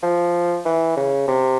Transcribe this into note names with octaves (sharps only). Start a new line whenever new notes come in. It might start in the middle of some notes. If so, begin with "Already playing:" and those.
F3
E3
C#3
C3